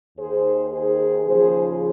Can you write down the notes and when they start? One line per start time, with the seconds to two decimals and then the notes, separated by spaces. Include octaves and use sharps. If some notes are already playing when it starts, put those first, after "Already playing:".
0.17 D#2 D#3 G#4 C5
0.71 G#4 C5
1.24 D#2 C#3 F3 G#4 C5